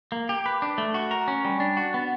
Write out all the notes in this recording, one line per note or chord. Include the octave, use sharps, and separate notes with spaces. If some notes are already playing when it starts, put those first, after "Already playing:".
A#3
G4
B4
D4
A3
F#4
A#4
C#4
G3
D4
F#4
B3